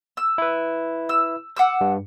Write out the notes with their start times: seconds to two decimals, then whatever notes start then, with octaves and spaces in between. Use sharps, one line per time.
0.17 E6
0.38 E4 B4
1.09 E6
1.57 F#5 D6 E6
1.81 G2